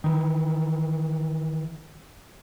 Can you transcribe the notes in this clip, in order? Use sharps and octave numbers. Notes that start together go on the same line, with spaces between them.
D#3 E3